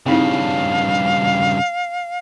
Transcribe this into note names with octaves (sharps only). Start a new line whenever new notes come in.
G2 C#3 C4 D#4 E4 F5